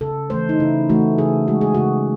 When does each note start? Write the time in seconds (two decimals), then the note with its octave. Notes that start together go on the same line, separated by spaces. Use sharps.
0.01 C#3 A4
0.30 E3 A3 C5
0.49 D#4
0.60 C#3 E4
0.89 E3 A3 F#4
1.18 C#3 G#4
1.48 G#3 F#4
1.61 G#4
1.74 C#3 F#4